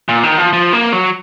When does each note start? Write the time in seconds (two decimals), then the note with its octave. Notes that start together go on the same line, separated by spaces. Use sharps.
0.09 A#2
0.23 D#3
0.38 F3
0.53 F3
0.73 A#3
0.93 F#3